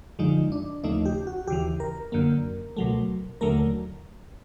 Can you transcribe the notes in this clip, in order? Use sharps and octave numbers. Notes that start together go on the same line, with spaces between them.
F#2 D3 F3 G#3 D#4
D4
D#2 C#3 F3 A3 D#4
G4
F#4
D#2 C#3 E3 G4
A#4
F#2 D3 F#3 A#3
C#2 B2 F#3 A3
D#2 D3 F#3 A3 A#4